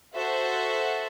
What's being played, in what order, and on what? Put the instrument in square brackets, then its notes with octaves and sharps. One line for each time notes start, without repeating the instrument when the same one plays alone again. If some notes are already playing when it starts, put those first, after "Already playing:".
[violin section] F#4 A4 C5 E5